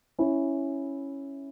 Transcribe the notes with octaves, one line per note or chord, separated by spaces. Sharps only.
C#4 E4